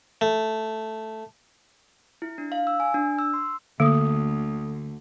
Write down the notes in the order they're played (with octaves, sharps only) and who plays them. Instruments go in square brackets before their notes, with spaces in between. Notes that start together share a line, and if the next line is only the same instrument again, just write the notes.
[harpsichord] A3
[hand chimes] E4
D4
F5
E6
G#5
D4
E6
C6
[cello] D2 [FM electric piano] D3 [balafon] A#3 [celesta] A4 D#6